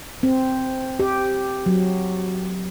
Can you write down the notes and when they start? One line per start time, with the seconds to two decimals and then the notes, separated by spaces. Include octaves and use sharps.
0.23 C4
0.99 G4
1.66 F#3